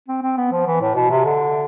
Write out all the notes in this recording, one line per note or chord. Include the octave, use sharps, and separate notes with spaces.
C4
C4
B3
F3
E3
A2
B2
C3
D3